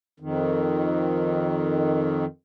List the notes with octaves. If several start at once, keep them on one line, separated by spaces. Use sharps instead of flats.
F2 D#3